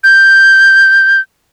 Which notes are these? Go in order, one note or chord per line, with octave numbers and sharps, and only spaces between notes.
G6